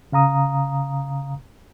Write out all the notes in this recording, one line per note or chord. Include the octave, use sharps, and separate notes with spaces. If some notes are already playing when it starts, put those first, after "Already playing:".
C#3 F5 A#5 D#6